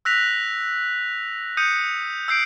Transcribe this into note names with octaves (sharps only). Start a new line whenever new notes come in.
E6 F#6 A#6 B6 F7
D#6 G6 C#7 D#7
E6 G6 C7 D7